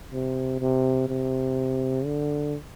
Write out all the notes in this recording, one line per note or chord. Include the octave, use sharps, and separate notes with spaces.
C3
C3
C3
D3